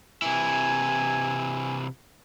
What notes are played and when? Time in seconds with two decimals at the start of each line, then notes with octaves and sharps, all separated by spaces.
0.22 C3 E3 E4 G#5